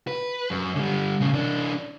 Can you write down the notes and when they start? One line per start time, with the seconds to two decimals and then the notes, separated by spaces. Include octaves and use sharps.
0.07 B4
0.50 F#2
0.75 D3 G3
1.21 A2 C#3
1.34 E3 D4